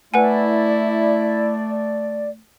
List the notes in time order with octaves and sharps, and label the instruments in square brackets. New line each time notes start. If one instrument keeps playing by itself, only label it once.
[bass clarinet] A3 [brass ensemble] E4 [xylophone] B4 F#5 G#5 [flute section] D5